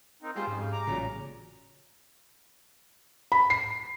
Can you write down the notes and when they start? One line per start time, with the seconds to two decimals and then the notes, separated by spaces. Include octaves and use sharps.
0.22 A#3 C4 D#4
0.36 G3 G#3 F4 G4 G#4 C5
0.47 F2 G#2 C#3
0.72 A#5 D6
0.87 A1 A#2 C#3 F#3
3.32 B5
3.50 C7